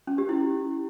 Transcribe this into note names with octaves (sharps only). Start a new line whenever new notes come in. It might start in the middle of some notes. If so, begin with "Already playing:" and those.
C#4
G4
E4